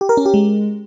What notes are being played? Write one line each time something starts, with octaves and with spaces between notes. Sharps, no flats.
G4
A#4
C#4
G4
G#3